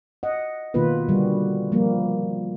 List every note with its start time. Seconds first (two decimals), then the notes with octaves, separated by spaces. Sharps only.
0.23 D#5 F#5
0.74 B2 D#3 A#3 B3 F4 B4
1.09 D3 G3 F#4
1.72 F3 G3 A#3